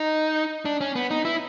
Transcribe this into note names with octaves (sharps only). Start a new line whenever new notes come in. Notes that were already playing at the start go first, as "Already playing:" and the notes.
Already playing: D#4
D4
C#4
B3
D#4
E4